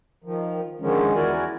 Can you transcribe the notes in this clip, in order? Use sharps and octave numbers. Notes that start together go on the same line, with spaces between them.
D#3 F3
D3 D#3 F3 G#3 C#4
E2 E4 F#4 A#4 D5 G#5